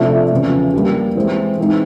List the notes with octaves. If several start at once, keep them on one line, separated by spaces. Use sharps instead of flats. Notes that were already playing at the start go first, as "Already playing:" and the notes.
Already playing: C3 F3 A3 D4
E2 C#3 F3 A3
G3 A#3 D4 G4
E3 G#3 C4
E3 G#3 C4 D#4